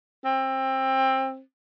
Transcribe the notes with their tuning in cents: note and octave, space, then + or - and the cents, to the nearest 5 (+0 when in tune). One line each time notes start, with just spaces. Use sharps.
C4 +20